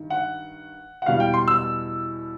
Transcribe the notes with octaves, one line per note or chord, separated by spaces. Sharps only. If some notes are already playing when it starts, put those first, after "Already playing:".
Already playing: G2 D#3
F#5
F#5
E2 B2 G3 F5
G5
C6
E6